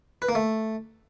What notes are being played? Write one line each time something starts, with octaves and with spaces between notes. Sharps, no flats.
B4
A#3
A3